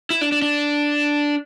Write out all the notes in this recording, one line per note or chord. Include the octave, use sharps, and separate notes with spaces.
E4
D4
D4
D4